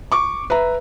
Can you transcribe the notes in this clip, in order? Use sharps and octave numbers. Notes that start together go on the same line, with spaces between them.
C#6 D6
B4 E5 A#5